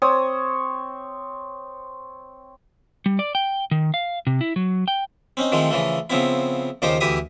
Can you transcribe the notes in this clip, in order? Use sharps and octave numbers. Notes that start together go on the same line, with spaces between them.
C4 C#5 D#6
G3
D5
G5
D#3
F5
C3
E4
F#3
G5
C4 C#4 D#4
D#3 F3 G#3 A3 C4
C#3 E3 F3 A3
C#3 F3 B3 C4 E4
D#2 C#3 F3 D#4 G4 C5
D2 E3 G4 E5 D#6